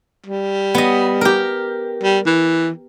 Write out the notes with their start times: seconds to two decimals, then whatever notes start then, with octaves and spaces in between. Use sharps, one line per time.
0.26 G3
0.75 B3 D#5
1.21 G4 A#4
2.03 G3
2.26 E3